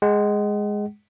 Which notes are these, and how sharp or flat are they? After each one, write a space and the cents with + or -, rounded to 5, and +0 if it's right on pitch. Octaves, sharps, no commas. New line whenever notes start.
G#3 -5 F#5 +35